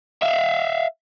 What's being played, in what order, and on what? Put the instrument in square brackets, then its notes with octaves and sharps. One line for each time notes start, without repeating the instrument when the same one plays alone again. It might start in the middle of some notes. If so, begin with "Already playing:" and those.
[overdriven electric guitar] E5 F5